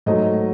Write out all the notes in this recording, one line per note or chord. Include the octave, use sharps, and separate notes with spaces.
G#2 F#3 A3 D#5